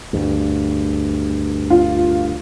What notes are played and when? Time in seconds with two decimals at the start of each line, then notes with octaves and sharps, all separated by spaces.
0.13 D2 G2
1.70 F4